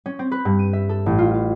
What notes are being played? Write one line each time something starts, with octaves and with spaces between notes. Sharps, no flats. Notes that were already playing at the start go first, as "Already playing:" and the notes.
C#4
C4
B4
G2
D#7
E5
A4
A1
F4
F4